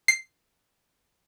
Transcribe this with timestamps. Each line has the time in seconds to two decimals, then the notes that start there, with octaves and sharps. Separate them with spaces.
0.08 C7